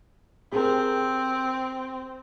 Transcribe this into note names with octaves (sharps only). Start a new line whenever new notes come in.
C4 G4 G#4 A#4